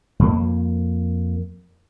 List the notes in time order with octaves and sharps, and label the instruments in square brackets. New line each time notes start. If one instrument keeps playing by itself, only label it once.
[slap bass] F2 A#3